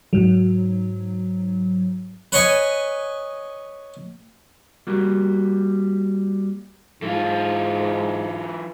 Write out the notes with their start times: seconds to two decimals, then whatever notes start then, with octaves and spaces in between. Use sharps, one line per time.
0.13 G#2 F#3
2.32 B4 C#5 D#5 G#5
4.87 G3 A#3 F#4
7.02 G#2 E3 F4